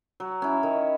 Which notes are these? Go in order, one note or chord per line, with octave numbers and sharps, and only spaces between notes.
F#3
C#4 E4
D#3